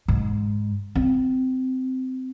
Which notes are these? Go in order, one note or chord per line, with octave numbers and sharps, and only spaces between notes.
G#2
C4